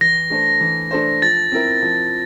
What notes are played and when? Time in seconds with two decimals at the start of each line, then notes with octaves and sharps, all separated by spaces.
0.01 E3 A#6
0.30 A3 D4 A4 C5
0.61 E3
0.91 A3 D4 A4 C5
1.22 F3 A6
1.52 C4 E4 A#4
1.82 F3